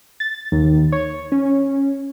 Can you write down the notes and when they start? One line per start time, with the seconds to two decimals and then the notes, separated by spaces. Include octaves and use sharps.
0.20 A6
0.52 D#2
0.92 C#5
1.32 C#4